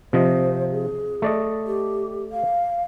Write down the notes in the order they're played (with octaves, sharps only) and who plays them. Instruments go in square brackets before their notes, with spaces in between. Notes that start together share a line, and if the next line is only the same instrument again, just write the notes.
[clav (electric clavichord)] C3 F3 D#5 [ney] C5
[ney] G#4
[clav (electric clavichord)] A3 D5 D#5
[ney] G4
F5